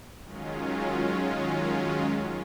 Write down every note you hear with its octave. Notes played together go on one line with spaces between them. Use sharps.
D#3 F#3 G#3 C#4 F4